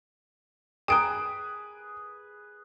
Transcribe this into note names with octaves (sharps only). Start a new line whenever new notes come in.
G#4 B4 G5 A#5 D#6 D7